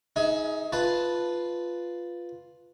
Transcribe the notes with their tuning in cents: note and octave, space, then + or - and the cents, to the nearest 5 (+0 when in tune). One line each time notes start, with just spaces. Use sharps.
D#4 +20 G#4 +15 E5 -20
F4 +0 B4 +0 A5 +0